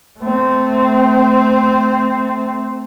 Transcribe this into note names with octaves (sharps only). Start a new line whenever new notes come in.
A3 C4